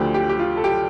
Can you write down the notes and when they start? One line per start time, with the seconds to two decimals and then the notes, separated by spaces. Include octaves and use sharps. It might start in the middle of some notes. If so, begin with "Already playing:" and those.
Already playing: D2 D3 F3 G4
0.14 G4
0.29 G4
0.39 F4
0.57 A4
0.64 G4